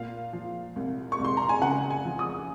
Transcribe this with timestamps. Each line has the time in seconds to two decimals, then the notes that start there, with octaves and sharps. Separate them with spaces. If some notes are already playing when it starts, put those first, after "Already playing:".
Already playing: A#2 F5
0.33 F3
0.76 C2
1.12 C#6
1.19 C2
1.24 C6
1.37 A#5
1.49 G#5
1.62 C#3 F#5
1.90 G#5
2.05 F3
2.19 D#6